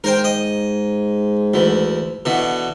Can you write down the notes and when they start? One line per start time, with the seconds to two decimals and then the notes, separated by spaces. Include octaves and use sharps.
0.04 G#2 A#4 C5 G5
0.24 D#5
1.54 D2 E3
2.25 B2 D3 E3